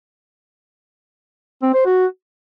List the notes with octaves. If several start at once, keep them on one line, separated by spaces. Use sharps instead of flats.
C4
C5
F#4